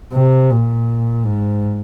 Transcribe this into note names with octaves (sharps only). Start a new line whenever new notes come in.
C3
A#2
G#2